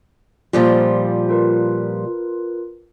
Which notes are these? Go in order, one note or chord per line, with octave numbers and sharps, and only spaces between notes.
A#2 F3 G3 F4 C5
F4 A#4 B4